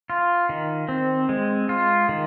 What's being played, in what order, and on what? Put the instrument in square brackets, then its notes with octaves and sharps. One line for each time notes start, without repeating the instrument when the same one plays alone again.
[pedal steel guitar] F4
D#3
C4
G#3
F4
D#3